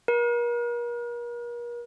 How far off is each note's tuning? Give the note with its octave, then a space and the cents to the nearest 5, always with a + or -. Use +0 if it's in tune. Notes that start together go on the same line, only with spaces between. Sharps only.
A#4 +40